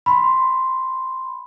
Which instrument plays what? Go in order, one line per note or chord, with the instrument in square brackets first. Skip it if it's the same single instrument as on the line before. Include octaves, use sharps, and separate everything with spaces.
[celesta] B5 C6